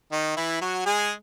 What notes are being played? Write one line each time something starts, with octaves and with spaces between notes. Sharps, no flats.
D#3 D#4
E3 E4
F#3 F#4
G#3 G#4